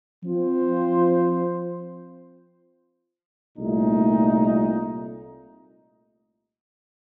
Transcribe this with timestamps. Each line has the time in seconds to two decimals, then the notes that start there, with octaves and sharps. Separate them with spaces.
0.24 F3 C4 F4 C5
3.58 C2 A#2 A3 D#4